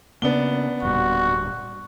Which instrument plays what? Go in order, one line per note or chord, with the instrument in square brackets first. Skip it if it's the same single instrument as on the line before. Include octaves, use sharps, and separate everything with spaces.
[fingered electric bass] C#3 A#3 [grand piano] B3 D4 G7
[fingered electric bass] D1 G2 A#2 [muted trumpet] F#4